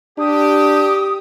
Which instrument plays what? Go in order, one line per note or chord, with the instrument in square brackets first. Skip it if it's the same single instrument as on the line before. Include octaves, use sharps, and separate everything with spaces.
[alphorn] D4 [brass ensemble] G4 [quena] D#6